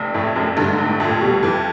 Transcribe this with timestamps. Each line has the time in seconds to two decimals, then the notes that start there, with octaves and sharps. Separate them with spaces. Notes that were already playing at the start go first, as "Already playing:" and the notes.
Already playing: F1
0.14 F2 A2
0.36 F1 F#2
0.57 G2 D3
0.73 G#2
0.78 F1
0.90 A2
1.00 F2
1.05 A#2
1.21 B2 G3
1.43 F2 E3